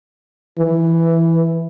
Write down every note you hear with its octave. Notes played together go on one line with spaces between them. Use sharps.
E3